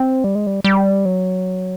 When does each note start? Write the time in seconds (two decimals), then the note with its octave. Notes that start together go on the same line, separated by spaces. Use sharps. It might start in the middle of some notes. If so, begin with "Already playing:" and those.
Already playing: C4
0.24 G3
0.35 G#3
0.47 G3
0.64 G3
1.05 F#3